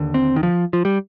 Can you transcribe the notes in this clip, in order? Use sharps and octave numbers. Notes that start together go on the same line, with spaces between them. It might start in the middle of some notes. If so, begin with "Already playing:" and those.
Already playing: D#2 D3
C4
D#3
F3
F3
G3